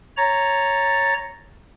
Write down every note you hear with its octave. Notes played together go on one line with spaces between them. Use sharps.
C#5 A#5 A6